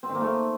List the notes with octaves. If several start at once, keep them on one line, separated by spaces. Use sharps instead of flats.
C4
D#3
A#3
A3